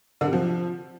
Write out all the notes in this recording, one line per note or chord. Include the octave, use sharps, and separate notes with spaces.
D3
C3
F3